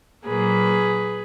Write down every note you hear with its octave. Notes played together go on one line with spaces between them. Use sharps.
A#2 F#3 A#3 G#4 B4